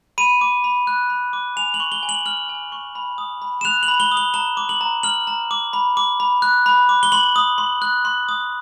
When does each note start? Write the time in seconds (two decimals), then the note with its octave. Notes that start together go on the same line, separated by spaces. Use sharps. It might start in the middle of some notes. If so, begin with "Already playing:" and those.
0.18 B5 D#7
0.41 D6
0.64 B5
0.87 F#6
1.10 B5
1.33 D6
1.56 G#5 F7
1.74 F#7
1.80 C#6
1.92 G7
2.03 G#5
2.09 F#7
2.26 F6 F#7
2.49 G#5
2.72 C#6
2.95 B5
3.18 D#6
3.42 B5
3.61 E7
3.65 F#6 F7
3.83 F#7
3.88 B5
4.00 G7
4.12 D#6
4.17 G7
4.34 A#5 G7
4.57 D6
4.69 F#7
4.81 A#5
5.03 F6 F#7
5.27 A#5
5.51 D6
5.73 B5
5.97 D6
6.20 B5
6.42 F#6
6.66 B5
6.89 D6
7.03 G7
7.12 C6 F#7
7.36 D#6
7.58 C6
7.82 F#6
8.05 C6
8.29 D#6